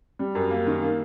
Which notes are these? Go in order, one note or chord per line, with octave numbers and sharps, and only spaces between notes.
G3
F#2
A#3
D#3
A#3